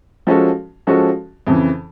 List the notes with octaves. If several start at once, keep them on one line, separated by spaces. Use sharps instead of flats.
F3 G#3 C#4 F#4 A4
F3 G#3 C#4 F#4 A4
F2 C#3 E3